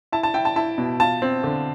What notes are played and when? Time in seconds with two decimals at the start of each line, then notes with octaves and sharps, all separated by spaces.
0.12 E4 A5
0.23 A5
0.34 E4 G5
0.45 A5
0.56 E4 A5
0.78 B2
1.00 F4 A5
1.22 C4
1.44 D3